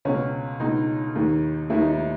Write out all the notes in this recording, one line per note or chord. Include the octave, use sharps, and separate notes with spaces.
C#2 B2 C#4
C#2 B2 D#4
D#2 D#3
D#2 D#3 E4
D#4
E4